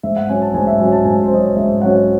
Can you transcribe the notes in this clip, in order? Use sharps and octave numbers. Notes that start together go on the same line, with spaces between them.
G#2 E5
F#5
F#3 C#4 G#5
A5
G#2 G#5
E5
F#3 C#4 G#5
A5
G#2 G#5
C5
F#3 C#4 D#5
C#5
G#2 E5
F#3 C#4 F#5